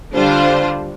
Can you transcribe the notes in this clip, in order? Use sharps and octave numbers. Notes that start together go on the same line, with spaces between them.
D3 G3 D4 F4 C5